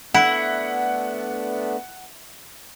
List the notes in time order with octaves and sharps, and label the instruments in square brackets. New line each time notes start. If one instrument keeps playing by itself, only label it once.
[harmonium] A3 B3 D4 [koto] E4 [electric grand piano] F#5